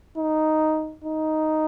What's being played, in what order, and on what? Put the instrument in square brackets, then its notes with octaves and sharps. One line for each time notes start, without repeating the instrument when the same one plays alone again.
[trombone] D#4
D#4